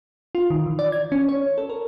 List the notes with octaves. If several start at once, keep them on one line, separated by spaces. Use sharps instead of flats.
F4
D#3
E3
D5
G#6
C#4
C#5
A4
A#4